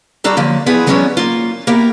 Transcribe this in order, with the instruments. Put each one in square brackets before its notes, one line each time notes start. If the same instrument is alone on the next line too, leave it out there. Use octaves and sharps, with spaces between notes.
[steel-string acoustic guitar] G3 D4 F#4 A4 A#5
D3 F3 F#3 A#3
F3 B3 E4 F4 G#4 B4
E3 F#3 G#3 B3 C#4 D4
A#3 F4
A#3 B3 E4 G4 A#4